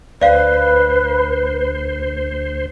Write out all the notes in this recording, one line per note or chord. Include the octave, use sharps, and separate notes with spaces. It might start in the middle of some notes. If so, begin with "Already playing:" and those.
D2 B4 C5 D5 F5